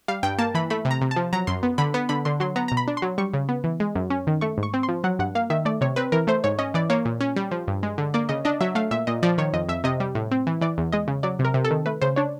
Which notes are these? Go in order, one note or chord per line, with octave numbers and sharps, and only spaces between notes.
G3 F5
G2 G5
A#3 A5
E3 B5
A3 B5
C3
A#5
C3
A5
F3
F#3 A#5
F#2 C6
B3
D3 B5
B3 B5
D3 B5
D3 C6
F#3 C6
B3 A#5
A#5
B2
B5
D4
C6
F#3
G3 C#6
C#3
B3
E3
G#3
F#2
C#4
D#3
A3 C#6
G#2
C#6
C4
C6
F3
F#3 F#5
G2 F#5
A#3 F5
D#3 E5
A3 D5
C3 C#5
C4 B4
E3 A#4
A3 C5
G#2 C#5
C#4 D#5
E3 D5
A#3 C#5
A#2
C#4
G3
F3
G2
G#3
D3
A#3 D5
C#3 D#5
D4 D#5
F#3 E5
A3 F5
A#2 E5
A#2 D#5
F3 D5
D#3 C#5
F2 D#5
F2 E5
C3 D#5
G3
A2
C4
E3
E3 D5
E2
G#3 D#5
C#3
F#3 D5
C3
A#4
C3
A4
D#3
A3 B4
C#3 C5
D4 C#5